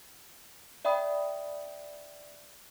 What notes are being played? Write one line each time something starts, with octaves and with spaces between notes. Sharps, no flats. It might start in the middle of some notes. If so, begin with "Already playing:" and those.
D5 E5 G5 B5 D#6